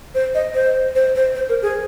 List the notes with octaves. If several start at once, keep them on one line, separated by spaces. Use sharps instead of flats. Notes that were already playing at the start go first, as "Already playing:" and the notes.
C5
D#5
C5
C5
C5
C5
A#4
G#4